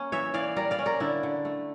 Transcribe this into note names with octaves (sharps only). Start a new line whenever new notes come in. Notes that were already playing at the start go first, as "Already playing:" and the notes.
Already playing: A#3 C#4
E3 C#5 E5
E3 D5 F5
G3 A#4 D5
D5 F5
C#4
A#4 D5
D3 E4
D3
A3